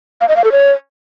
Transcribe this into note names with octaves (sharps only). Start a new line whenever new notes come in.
F5
D#5
F5
A4
C#5